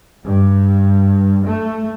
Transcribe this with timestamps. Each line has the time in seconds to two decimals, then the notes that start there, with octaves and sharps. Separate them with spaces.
0.24 G2
1.46 A3